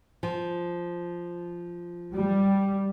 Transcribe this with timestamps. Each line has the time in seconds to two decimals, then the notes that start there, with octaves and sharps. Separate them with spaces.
0.23 F3
2.12 G3